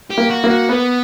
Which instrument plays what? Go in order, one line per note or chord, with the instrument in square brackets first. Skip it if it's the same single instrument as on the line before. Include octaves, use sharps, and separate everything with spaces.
[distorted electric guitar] G4
[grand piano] A#3
[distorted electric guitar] F#4
[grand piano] A#3
[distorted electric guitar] F#4
[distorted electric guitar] B3 [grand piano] B4